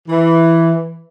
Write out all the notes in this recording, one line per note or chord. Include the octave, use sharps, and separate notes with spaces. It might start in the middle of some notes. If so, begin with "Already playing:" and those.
E3